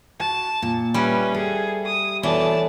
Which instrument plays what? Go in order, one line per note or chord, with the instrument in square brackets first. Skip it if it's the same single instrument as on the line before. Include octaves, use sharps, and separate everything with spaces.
[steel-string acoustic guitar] F#4 [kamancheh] A5
[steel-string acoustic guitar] A#2
[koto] G3 [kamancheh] C#4 B4 [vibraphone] G4 E5 G5
[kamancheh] G#4 [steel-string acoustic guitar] A4
[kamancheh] D#6
[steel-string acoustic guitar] B2 [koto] E3 [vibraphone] A4 C#5 [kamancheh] D5 A5